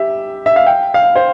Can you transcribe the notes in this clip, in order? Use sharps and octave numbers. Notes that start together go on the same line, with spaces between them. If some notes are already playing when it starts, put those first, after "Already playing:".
Already playing: G4 E5
E5
F5
G5
F5
C5